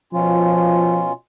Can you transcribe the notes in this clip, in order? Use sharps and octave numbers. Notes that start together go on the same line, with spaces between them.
B2 F3 C#4 F4